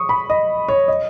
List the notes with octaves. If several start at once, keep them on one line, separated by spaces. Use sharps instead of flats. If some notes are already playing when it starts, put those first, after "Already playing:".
Already playing: C#6 D#6
B5
D#5
C#5
D#5